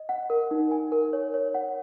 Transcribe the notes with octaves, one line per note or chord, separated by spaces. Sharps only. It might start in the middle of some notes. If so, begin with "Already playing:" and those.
Already playing: D#5
F#5
A#4
D#4
G#5
A#4
C#5
C#5
F#5